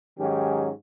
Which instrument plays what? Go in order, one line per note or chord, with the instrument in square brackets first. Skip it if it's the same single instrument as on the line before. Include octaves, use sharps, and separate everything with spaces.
[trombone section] G#2 D#3 F#3 C#4 G4